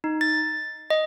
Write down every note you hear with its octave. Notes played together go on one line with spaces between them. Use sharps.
D#4
A6
D#5